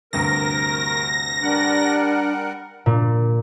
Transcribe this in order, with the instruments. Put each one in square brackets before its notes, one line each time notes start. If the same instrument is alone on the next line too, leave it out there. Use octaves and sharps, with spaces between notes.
[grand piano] D2 G2 C3 [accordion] A#4 [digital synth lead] A#6
[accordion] G3 A#4 F#5 [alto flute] D4
[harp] A#2